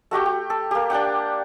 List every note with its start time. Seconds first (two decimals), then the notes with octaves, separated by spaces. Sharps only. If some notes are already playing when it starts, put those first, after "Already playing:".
0.11 A3 F#4 G4 G5
0.26 G4
0.50 A4
0.71 A#3 G4
0.90 D4 G4 F#5 G5